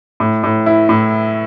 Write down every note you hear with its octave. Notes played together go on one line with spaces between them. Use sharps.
A2
A2
E4
A2